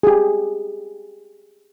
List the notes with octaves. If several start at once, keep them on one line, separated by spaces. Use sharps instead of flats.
G4 G#4